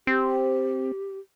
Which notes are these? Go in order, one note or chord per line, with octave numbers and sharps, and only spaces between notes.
C4 G4